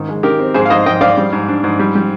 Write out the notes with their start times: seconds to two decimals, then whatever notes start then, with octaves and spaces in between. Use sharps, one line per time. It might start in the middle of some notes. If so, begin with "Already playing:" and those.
Already playing: G#2 D#3
0.09 G#3
0.23 D#3 G4 A#4
0.39 C4
0.54 G#2 G#4 C5
0.65 F5
0.70 G#2 C5 D#5
0.86 G#2 D#5 G5
1.01 G#2 D5 F5
1.17 G3
1.32 G#2
1.48 D4
1.64 G#2
1.79 G3
1.95 G3